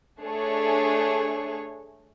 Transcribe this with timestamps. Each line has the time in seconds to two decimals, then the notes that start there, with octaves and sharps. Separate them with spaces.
0.20 A3 D4 G#4 C#5